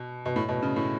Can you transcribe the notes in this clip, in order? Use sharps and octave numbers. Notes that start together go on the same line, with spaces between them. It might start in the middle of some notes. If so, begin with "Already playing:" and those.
Already playing: B2
B2
A2
B2
C#3
A2